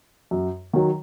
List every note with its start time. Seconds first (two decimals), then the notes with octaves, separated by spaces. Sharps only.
0.31 F#2
0.73 D#3 F#3